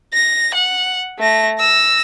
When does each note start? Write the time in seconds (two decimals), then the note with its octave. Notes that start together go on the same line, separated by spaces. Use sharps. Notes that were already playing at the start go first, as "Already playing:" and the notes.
0.14 A#6
0.54 F#5
1.19 A3 A#6
1.59 E6 A#6